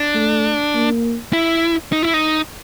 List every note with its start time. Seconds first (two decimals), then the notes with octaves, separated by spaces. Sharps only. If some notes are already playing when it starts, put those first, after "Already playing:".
Already playing: D4
0.15 A3
0.75 A#3
1.33 E4
1.92 D#4
2.02 E4
2.14 D#4